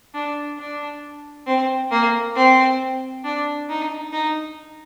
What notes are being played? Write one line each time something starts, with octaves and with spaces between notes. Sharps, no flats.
D4
D4
C4
A#3
C4
D4
D#4
D#4